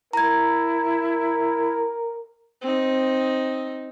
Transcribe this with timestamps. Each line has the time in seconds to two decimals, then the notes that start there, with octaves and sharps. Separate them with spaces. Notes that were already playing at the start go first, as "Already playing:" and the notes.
0.13 E4 A#4 A#5 G#6
2.61 C4 D#4